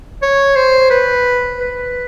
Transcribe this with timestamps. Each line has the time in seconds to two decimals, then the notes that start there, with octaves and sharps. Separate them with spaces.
0.22 C#5
0.56 C5
0.91 B4
1.60 B4